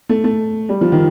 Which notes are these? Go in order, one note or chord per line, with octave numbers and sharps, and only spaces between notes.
A3
A3
G3
F3
D#3